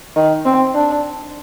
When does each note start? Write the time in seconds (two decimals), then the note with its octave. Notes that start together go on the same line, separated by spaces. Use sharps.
0.16 D#3
0.45 C4
0.74 D4